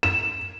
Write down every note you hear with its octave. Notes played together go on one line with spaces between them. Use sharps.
E7